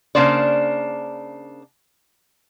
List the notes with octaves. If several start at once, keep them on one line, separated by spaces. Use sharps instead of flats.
C#3 F3 A#3 D4 C5 D5